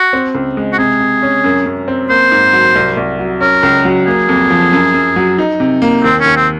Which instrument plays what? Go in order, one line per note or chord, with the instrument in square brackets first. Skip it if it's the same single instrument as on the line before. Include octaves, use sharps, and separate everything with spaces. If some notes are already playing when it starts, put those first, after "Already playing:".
Already playing: [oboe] F#4
[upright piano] C4
C#2
G#3
[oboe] F#4
[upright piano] C3 [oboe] G#4
[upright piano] C3
C#4
F#2
F#2
C4
[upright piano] A#3 [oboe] C5
[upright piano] G#2
F#3
C2
C2
F#3
[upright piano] C#4 [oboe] A#4
[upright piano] C#2
F#3
[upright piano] A#3 [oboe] G#4
[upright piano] F2
F3
F#2
F#2
F#3
D#4
C3
A#3
[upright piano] D#2 [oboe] C4
[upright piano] D#2 [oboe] C#4
[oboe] C4